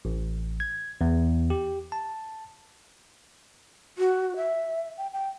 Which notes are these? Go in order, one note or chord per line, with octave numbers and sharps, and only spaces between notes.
A1
G#6
E2
G4
A5
F#4
E5
G5
G5